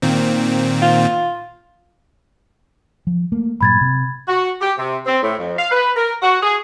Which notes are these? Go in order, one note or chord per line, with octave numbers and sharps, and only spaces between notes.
A#2 D#3 C4
F4
F3
A3 A#3
G2 A#2 F#3 B5 G#6 A6
C3
F#4
G4
C3
C4
A2
F2
F5
B4
A#4
F#4
G#4